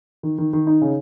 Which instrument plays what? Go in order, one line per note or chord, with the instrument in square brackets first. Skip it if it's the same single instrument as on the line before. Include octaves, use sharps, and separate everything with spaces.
[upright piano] D#3
D#3
D#3
D#4
C#3